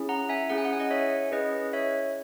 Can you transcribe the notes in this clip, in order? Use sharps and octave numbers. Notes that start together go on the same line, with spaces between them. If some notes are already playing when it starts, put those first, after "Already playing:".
Already playing: C#4 E4 G#4
F#5 A#5
E5 G#5
C#4 E4 G#4 F#5
G#5
F#5
G#5
D#5 F#5
C#5 E5
C#4 E4 G#4 B4 D#5
C#5 E5